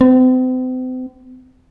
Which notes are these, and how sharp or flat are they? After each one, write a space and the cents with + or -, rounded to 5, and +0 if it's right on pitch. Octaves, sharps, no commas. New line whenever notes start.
C4 -40